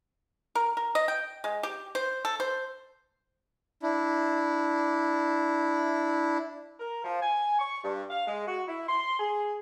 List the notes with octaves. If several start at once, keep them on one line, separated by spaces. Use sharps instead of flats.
A#4
A#4
D#5
G5
G#3
G4
C5
A4
C5
D4 E4
A#4
F3
G#5
C#6
G2
F5
G#3
F#4
E4
C6
G#4